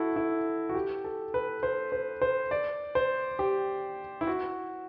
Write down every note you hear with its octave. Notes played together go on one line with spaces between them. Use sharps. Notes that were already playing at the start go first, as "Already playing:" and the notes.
Already playing: E4 F#4 A4
E4
F#4
G4
A4
B4
C5
C5
C5
D5
C5
G4
E4
F#4